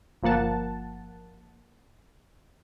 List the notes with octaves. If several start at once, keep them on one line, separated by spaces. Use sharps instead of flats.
G1 F3 A#3 F#5 A5